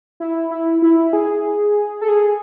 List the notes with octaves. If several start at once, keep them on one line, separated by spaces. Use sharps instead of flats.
E4
E4
E4
G#4
A4
G#4